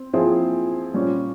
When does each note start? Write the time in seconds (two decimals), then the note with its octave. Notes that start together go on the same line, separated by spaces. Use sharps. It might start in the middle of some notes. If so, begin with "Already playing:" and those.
Already playing: C4
0.13 F3 C4 E4 G#4
0.94 A#2 G3 C#4